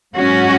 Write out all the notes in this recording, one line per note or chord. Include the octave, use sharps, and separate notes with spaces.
G#2 F#3 C#4 F#4